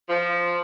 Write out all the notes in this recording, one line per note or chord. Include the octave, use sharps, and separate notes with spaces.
F3